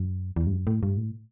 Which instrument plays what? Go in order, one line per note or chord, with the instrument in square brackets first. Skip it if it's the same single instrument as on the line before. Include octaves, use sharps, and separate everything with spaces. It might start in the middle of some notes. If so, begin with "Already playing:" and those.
Already playing: [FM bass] F#2
E2
G2
F#2
A2
G2
A2